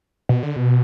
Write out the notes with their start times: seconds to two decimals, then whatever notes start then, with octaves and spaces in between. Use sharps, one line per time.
0.29 B2
0.43 D3
0.56 B2